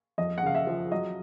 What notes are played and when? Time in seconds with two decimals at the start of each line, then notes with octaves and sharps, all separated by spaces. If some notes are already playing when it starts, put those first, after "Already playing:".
0.18 F2 D#5
0.38 F#5
0.43 C#3 F5
0.55 E5
0.67 F3
0.92 F#3 D#5